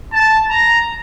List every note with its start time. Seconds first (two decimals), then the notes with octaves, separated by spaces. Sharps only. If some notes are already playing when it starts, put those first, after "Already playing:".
0.12 A5
0.50 A#5